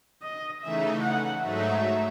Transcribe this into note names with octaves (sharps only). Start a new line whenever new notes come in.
D#5
C#3 E3 A3 D#4 E5
F#5
G#2 F#3 A3 D#4 E5